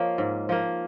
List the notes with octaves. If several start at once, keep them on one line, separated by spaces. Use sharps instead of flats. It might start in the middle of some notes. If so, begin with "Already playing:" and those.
Already playing: F3 A#3 C#5 D#5
G#2
F3 A#3